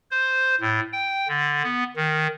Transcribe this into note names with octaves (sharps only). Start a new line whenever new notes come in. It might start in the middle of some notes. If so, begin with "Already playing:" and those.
C5
A2
G5
D3
B3
D#3